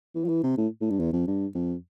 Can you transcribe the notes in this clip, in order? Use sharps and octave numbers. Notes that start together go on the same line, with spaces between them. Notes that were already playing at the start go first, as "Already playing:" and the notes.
E3
F3
E3
C3
A2
A2
G2
E2
F2
G2
F2